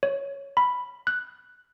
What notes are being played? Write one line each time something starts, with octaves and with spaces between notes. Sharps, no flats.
C#5
B5
F#6